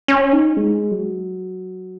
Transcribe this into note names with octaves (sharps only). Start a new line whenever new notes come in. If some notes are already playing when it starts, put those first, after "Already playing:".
C#4
D#4
G#3
F#3